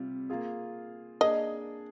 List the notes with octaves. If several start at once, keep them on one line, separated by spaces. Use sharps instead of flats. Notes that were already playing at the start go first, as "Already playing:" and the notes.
Already playing: C3 G3 F4
A#3 F4 G#4
A#3 D4 G#4 D#5